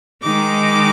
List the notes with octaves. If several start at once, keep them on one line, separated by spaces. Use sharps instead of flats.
D#3 G#3 D#4 D6